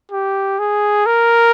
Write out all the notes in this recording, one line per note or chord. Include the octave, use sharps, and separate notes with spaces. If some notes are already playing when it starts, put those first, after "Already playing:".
G4
G#4
A#4